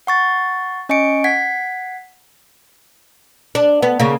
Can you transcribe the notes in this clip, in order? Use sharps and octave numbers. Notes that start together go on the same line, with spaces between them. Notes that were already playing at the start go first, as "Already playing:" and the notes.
F#5 C#6 A6
C#4 D#5 G#5 C#6 C#7 D7
F#5 G#6 B6
D4
B3
C#3 A#3